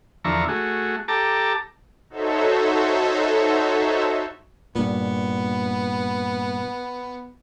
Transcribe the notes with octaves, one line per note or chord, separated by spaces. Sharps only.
E2 D3 F3 E5 A#5 C#6
A3 F#4 G#4
G4 A4 A5 A#5 D6
D#4 F#4 A4 C5 C#5 E5
G2 A#2 B3